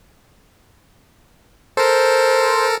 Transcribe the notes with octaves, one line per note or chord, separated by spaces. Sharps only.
A4 A#4 C5